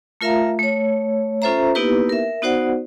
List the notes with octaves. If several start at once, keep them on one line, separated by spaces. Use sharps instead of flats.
A3 F4 A#4 E5 F5 A#5
A3 C#5
C#4 F4 A4 C5 E5 A#5
A#3 B3 D#4 E4 G4 B4
A#4 E5
B3 D#4 F#4 C5 D5 F#5